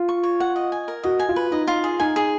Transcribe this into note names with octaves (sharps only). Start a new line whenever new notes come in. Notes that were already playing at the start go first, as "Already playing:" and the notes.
Already playing: F4
C#6
C#5
F#5
D#5
G#5
A#4
F#4 D#5
G#5
F4
B4
D#4 D#5
F4
G#4
D#4 G#5
G#4